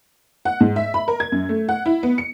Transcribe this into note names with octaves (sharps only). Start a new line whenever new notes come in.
F#5
G#2
E5
B5
A#4
G#6
F#2
A3
F#5
E4
B3
C#7